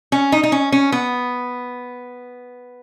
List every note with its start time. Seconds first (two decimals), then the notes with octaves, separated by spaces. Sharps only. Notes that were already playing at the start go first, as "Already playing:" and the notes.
0.12 C#4
0.32 D#4
0.43 D#4
0.52 C#4
0.72 C#4
0.92 B3